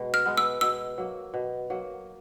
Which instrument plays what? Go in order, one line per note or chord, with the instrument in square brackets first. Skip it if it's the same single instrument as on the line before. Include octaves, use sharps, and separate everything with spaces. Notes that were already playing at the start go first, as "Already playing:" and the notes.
Already playing: [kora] B2 G#3 B3
[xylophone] F6
[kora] G#3 B3
[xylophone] E6
[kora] B2 [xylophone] E6
[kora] F#3 A#3
B2
F#3 A#3